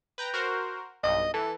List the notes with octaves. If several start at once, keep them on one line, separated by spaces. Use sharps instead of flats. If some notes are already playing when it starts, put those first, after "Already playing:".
B4 G5 A#5
F#4 A#4 C5
B1 G2 D#5
E3 A4